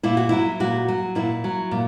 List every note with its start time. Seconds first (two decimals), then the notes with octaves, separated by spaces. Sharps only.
0.03 A#2 E4
0.17 F#4
0.29 F#3 E4
0.60 A#2 F#4
0.88 F#3
1.15 A#2 E4
1.44 F#3
1.71 A#2